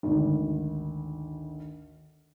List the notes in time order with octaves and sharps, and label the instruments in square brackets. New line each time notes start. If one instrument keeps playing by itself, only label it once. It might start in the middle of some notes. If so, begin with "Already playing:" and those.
[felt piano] G#1 D2